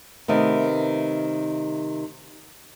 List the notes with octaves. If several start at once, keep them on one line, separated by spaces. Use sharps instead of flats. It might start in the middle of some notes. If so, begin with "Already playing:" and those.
C3 D#3 A3 B3